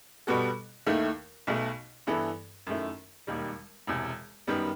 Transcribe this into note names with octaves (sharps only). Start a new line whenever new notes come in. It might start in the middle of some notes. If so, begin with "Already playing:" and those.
B2 G3 B3 F#4 A4
D#2 D#3 A3 E4
B1 B2 A3
G2 E3 B3 E4 A4
F#2 D#3 A3 E4
E1 D#2 D#3 G3
E1 E2 C3
F#2 D#3 G3 B3